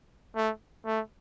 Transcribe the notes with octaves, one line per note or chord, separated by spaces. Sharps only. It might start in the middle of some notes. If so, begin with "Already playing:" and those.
A3
A3